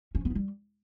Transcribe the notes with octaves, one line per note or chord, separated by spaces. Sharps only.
C#4
F3
B3
E4
G3